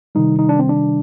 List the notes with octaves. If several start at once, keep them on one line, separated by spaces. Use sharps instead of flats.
C3 D#3 G3 D#4
D#4
D4
C4
D4